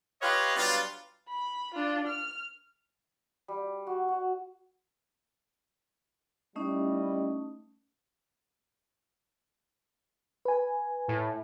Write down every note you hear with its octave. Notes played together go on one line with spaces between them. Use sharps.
F4 G4 B4 C#5 D#5 F5
F#3 G3 B3 D4 F4
B5
D4 F4
F6
G3
F#4
F#4
G3 A3 C#4 D#4 E4 D#5
B4 G#5
A2